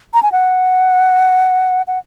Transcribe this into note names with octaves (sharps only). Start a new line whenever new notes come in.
A#5
G#5
F#5
F#5